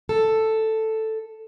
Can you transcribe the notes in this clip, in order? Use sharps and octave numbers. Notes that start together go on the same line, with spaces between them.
A4